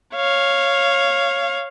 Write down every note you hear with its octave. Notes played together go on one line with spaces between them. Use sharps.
C#5 F5